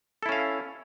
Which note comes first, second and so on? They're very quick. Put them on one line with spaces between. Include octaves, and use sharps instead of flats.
A4 E4 C#4 F5